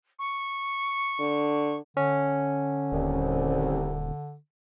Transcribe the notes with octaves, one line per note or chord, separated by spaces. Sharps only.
C#6
D3
D3 C#4
D#1 C2